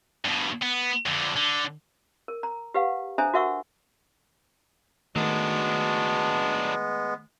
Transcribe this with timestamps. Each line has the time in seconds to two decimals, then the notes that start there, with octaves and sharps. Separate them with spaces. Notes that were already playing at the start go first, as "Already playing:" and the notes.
0.25 G2 B2
0.63 B3
1.06 F2 D3
1.36 D3
2.28 A#4
2.43 A#5
2.74 G4 B4 F5 F#5
3.18 D4 A4 C5 E5 G#5 A#5
3.34 F#4 A#4 E5 F#5 C#6 E6
5.16 D#3 F#3 G#3 A3 B3 D4